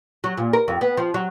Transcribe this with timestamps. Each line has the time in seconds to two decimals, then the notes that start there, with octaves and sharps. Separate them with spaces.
0.24 F#3
0.37 A#2
0.53 A#4
0.68 F2
0.81 B3
0.97 F3
1.14 F#3